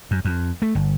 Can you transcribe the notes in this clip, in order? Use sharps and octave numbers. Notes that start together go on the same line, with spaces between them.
F#2
F2
A3
G1